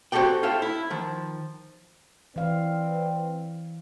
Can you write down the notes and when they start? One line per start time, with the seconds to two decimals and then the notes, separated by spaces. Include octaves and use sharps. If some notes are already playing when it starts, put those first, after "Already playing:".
0.12 C4 F#4 G4 A4 D5 G5
0.43 F4 A4 C#5 E5 G5
0.62 E4
0.90 D#3 F3
2.36 E3 C4 B4 D5 F5